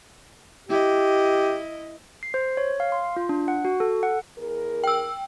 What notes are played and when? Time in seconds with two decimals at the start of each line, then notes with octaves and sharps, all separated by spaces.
0.69 E4 G4 D#5
2.23 C7
2.34 C5
2.57 C#5
2.80 F5
2.92 C6
3.16 F4
3.29 D4
3.48 F#5
3.65 F#4
3.80 A4
4.03 F#5
4.38 E2 G#4 A#4
4.84 G5 E6